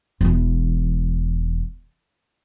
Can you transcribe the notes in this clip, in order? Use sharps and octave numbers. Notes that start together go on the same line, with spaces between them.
E1 E3